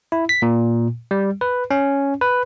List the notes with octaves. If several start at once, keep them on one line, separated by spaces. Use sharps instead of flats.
E4
B6
A#2
G3
B4
C#4
B4